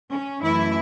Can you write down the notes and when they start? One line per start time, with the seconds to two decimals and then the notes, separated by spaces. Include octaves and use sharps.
0.12 C#4
0.42 F#2 E3 A3 E4